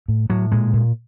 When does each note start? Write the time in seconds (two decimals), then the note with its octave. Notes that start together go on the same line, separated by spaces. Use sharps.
0.08 A2
0.30 A2 F#3
0.52 A#2 G#3
0.73 A#2